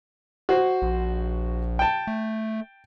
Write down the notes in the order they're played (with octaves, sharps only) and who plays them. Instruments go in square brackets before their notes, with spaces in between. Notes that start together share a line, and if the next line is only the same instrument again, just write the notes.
[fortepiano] F#4 C5
[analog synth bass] A#1
[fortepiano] G5 A5
[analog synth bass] A3